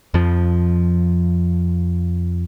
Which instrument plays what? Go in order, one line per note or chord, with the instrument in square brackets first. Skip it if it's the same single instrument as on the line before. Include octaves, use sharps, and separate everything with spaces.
[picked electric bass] F2 F3